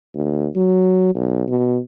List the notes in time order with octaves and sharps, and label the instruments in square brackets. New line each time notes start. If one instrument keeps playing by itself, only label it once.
[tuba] D2
F#3
B1
B2